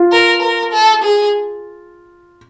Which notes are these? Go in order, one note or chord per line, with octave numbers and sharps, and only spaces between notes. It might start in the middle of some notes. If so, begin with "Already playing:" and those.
Already playing: F4
A#4
A#4
A4
G#4